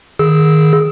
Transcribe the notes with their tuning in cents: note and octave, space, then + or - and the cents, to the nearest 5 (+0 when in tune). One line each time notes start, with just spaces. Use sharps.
D#3 +0 G#4 +5 E6 -20